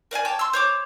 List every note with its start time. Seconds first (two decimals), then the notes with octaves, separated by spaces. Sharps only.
0.11 A#4 D5 F#5 G#5
0.25 C#5 G5 A5 D6
0.39 C6 E6
0.53 C5 C#5 D6